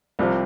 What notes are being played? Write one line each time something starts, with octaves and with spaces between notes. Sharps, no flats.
C2 C3 F3